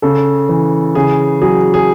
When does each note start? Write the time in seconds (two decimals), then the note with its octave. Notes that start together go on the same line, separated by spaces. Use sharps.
0.02 C#3 A4
0.49 E3
0.95 C#3 G#4
1.42 F#3 G#4
1.74 G#4